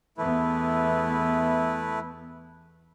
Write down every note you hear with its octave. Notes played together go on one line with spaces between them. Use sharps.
E2 A3 B3 E4 B4